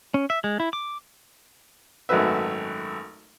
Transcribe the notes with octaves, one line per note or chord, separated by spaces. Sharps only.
C#4
E5
G#3
E4
D6
G#1 F#2 A3 F#4 B4 E5